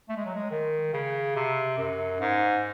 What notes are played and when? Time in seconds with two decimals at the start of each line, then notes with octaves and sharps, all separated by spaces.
0.08 A3
0.16 G#3
0.25 F#3
0.34 G#3
0.50 D#3
0.93 C#3
1.35 C3
1.77 F#2
2.20 G#2